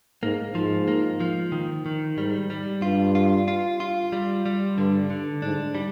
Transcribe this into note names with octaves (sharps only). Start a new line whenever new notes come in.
G#2 A#3
G#2 F3
A#3
F3
D#3
D#3
G#2 G3
G3
G2 F4
F4
F4
F4
G3
G3
G2 D3
D3
G#2 D4
G3